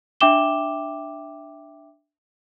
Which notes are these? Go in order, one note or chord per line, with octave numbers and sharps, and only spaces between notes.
D4 E5 G5 D6 E7 G7